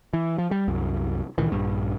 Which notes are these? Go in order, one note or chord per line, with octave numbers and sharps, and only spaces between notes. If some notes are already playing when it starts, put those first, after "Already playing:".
E3
F3
G3
C2 F#2
C#2 A#2 D#3 E3
A#1 G2